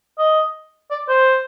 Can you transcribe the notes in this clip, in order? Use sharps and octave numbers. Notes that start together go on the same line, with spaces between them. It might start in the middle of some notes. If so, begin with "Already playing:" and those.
D#5
D5
C5